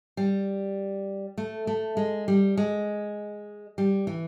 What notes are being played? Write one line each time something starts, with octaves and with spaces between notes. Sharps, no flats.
G3
A3
A3
G#3
G3
G#3
G3
E3